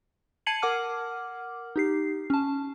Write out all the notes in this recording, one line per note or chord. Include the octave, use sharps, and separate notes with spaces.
A5 G#6 C7 C#7 D#7 F#7
A#4 F#5 D6 F6
D#4 G4 C7
C#4 A5